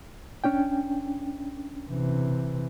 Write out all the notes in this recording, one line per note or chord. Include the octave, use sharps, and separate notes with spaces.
C#4 D4 G5
C3 E3